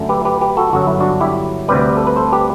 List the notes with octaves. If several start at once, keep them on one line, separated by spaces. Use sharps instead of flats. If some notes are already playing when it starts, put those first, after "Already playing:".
Already playing: F#2 D3 A3
G4 B4
G4 B4
G4 B4
F#4 A4
G1 F#2 F#3 F#4
E4
D4 F#4
E4 G4
D2 C3 G3 B4 D5
A4
B4
A4 C5
G4 B4